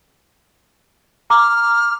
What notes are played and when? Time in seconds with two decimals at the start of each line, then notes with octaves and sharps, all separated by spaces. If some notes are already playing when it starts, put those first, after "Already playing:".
1.30 A#5 D6 F6